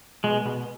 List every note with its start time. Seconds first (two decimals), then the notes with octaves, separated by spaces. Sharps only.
0.24 B2 G#3
0.45 B2